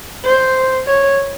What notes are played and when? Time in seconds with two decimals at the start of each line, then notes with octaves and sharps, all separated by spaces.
0.25 C5
0.87 C#5